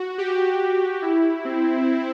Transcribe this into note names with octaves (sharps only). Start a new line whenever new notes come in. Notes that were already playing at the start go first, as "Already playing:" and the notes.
Already playing: F#4
G4
E4
C4